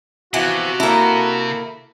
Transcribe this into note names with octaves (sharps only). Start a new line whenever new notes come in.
C3 E3 F3 B3 F#4
A#3 E4 A4 A#5